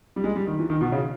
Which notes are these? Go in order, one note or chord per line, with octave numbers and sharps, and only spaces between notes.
G3
G#3
G3
D#3
E3
D#3
B2
C#3